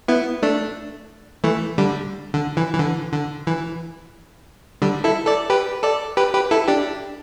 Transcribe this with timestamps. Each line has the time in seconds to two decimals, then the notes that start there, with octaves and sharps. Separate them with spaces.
0.08 B3 E4
0.42 A3 D4
1.44 E3 A3
1.78 D3 G3
2.34 D3
2.57 E3
2.75 E3
2.79 D3
3.13 D3
3.47 E3
4.82 D3 G3
5.04 E4 A4
5.26 A4 D5
5.50 G4 B4
5.83 A4 D5
6.17 G4 B4
6.33 G4 B4
6.51 E4 A4
6.68 D4 G4